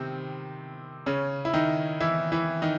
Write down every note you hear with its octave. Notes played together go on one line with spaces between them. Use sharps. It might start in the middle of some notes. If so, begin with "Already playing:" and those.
Already playing: C3 D#3 C4
C#3 C#4
E4
D#3 D#4
E3 E4
E3 E4
D#3 D#4